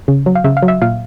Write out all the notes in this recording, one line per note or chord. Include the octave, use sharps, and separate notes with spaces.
C#3
F#3
F5
C#3 E5
F5
F#3
E5
A#2 F5